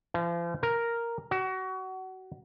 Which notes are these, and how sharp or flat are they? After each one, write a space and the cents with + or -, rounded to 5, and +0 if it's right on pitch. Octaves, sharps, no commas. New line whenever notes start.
F3 -40
A#4 +0
F#4 +25